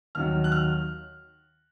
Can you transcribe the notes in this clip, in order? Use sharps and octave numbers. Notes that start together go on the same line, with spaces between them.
D#2 D#3 F#3 F6
F#6
F6